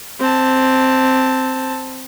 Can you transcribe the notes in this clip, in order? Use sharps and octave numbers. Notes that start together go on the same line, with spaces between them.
C4 A5